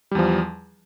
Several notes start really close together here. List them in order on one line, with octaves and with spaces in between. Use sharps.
G3 E2 F3